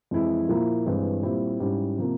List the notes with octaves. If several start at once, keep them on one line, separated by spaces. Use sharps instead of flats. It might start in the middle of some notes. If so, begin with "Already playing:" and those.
F2 E3 G#3 E4
A#2 F3 A#3 E4
G2 E3 G#3 C4
A#2 G3 C4 E4
G#2 G3 C#4 E4
C3 F3 A#3